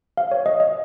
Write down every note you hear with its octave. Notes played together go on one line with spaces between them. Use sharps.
F5
C#5
D#5
D#5